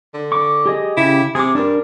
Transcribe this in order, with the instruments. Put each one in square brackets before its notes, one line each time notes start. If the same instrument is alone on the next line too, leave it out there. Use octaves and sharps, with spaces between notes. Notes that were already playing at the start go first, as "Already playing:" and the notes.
[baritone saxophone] D3
[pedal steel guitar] C#6 D6
G4 G#4 D#5
[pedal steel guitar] C#3 G4 [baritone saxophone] E4
[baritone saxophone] C3 [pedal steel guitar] G#4 D6
[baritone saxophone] G2 [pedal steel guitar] D4 A#4